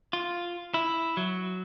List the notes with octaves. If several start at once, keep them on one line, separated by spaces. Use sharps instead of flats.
F4
E4
F#3